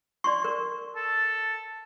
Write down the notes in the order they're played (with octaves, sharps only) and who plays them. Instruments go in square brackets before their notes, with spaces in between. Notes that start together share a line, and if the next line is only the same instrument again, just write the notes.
[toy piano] D5 C6 C#6
A#4
[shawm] A4